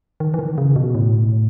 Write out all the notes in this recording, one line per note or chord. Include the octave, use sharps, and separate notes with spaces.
D#3
E3
D#3
C#3
B2
A2